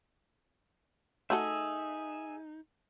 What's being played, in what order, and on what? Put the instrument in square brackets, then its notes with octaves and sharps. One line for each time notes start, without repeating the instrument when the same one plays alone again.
[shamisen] A3 F#4 A4 [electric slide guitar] D#4 [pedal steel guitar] G#4 E5